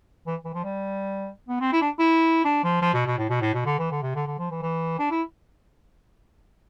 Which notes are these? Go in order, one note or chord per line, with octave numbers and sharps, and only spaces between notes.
E3
E3
F3
G3
B3
C4
E4
D4
E4
D4
F3
F3
B2
B2
A2
B2
A2
B2
D3
E3
D3
C3
D3
D3
F3
E3
E3
D4
E4